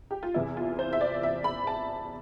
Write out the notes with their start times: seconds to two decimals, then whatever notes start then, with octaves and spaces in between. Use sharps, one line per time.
0.11 G4
0.23 F4
0.34 E2 C3 E3 B3 E4
0.57 F4
0.79 C5
0.93 E5
1.01 D5
1.23 E5
1.44 B5
1.67 A5